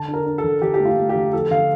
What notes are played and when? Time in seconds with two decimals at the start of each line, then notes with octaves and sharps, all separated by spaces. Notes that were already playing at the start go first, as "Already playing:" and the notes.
Already playing: D3 A5
0.08 D4
0.14 A#4
0.26 D4
0.38 A4
0.44 D3
0.62 D3 G4
0.74 G4
0.80 A3
0.85 F4
0.97 A3
1.09 G4
1.16 D3
1.33 F3 A4
1.51 D3 F5